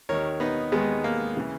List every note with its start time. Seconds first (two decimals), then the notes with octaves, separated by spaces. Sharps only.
0.09 D#2 D#3 A#4 C#5
0.40 B3 D#4
0.72 D#2 D#3 G#3 B3
1.04 A#3
1.37 C#3 E3